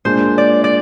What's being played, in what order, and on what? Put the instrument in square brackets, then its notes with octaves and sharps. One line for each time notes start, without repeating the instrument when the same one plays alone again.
[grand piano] A#2 G#3 D4 G#4 [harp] C5
[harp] D5
D5